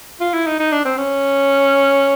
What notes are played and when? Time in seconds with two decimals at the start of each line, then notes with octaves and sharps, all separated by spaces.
0.21 F4
0.34 E4
0.47 D#4
0.60 D#4
0.72 D4
0.85 C4
0.97 C#4